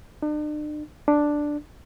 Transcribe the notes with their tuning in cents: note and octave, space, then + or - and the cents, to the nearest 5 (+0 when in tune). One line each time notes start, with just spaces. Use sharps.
D4 +45
D4 +5